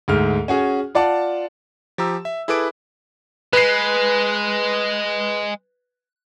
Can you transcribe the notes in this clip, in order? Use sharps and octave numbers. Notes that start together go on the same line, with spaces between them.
D2 G#2 F6
C#4 F#4 G#4
F4 D5 F#5 A5
F3 G4 A#5 E6
E5
E4 G#4 A4 B4 D6 D7
G#3 B4 C7